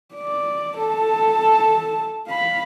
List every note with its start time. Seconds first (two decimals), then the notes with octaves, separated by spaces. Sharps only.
0.15 D5
0.77 A4 A5
2.27 F5 B5